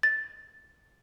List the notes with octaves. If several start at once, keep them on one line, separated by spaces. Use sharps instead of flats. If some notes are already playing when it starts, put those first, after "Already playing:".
A6